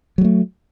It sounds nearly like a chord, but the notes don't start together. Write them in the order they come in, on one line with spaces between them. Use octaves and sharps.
F#3 G3 A3